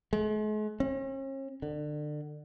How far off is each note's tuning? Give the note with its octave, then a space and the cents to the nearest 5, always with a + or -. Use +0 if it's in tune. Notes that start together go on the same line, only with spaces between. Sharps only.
G#3 +45
C#4 -45
D3 +30